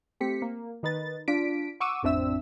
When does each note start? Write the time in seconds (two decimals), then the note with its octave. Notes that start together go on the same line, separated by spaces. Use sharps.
0.20 A3 C4 G4 B6 C#7
0.42 A#3
0.83 D#3 D#4 B4 A6
1.28 D4 F4 B6 D7
1.80 F#5 C#6 D6 E6 D#7
2.02 A1 F2 C4 D4 E5 E6